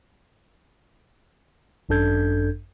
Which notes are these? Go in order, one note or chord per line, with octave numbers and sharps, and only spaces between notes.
G#1 F#2 D4 A4 G6 G#6